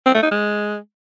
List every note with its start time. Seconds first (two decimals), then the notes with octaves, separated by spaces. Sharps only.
0.06 C4
0.14 A3
0.23 D#4
0.31 G#3